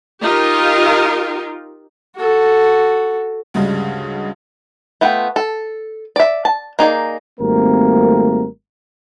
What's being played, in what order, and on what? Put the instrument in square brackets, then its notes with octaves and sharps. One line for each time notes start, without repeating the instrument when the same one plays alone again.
[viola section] D#4 F4 G4 A#4
[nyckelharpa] F#4 A4
[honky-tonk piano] D2 G2 C#3 G3 G#3
[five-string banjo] A3 B3 F4 G5
A4
D5 E5
A5
A#3 D#4 G#4 D5
[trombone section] G#1 G3 A3 A#3 C4 A#4